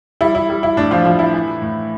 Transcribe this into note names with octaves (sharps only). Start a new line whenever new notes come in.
G3 E4
E4
G3
E4
A2 D4
F3 F4
A2 F3 F4
E4
E3
A2